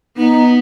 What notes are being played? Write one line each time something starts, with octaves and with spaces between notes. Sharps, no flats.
B3 D#4